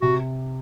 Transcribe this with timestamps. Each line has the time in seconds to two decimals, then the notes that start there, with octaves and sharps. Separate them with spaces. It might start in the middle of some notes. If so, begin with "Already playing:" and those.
0.02 C3 F#4